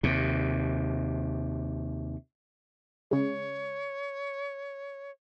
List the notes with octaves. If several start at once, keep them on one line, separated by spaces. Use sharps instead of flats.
D#2 C3
C#3 G#3 C#5